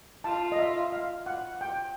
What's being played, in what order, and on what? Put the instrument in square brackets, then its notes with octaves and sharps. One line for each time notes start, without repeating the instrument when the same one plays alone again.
[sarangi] F4 [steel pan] A5
[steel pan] D#5
E5
F5
F#5
G5